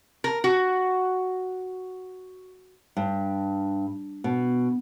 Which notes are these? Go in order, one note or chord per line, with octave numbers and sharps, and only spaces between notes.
A#4
F#4
G2
B2